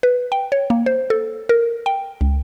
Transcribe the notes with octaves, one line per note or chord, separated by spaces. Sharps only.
B4
G5
C#5
A#3
C5
A4
A#4
G5
C#2